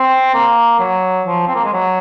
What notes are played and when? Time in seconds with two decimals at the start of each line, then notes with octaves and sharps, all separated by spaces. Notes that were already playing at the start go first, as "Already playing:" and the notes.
Already playing: C4
0.34 A#3
0.80 F#3
1.26 F3
1.47 C4
1.55 A#3
1.64 G#3
1.73 F#3